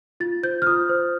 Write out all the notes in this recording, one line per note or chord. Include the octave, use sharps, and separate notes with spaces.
F4 A6
C5 G6
F6
F4 D#6
C5